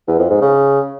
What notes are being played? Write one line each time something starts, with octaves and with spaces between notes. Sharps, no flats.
E2
F2
G#2
C#3